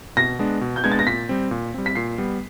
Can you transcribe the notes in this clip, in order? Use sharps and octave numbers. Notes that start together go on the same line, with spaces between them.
B2 A#6
G#3 B3 D4
B2
G6
G#3 B3 D4 G#6
A6
A#6
A#2 B6
G3 C4
A#2
G3 C4
B6
A#2 C7
G3 B3